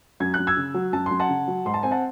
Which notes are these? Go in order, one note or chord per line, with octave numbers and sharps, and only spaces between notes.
F#2 G#6
F#2 F#6
E6 G#6
C#3
F#3
F#2 A5
F#2 C6
F#5 A5
C#3
F#3
G#2 C6
A5
C4 G#5
F#5 A5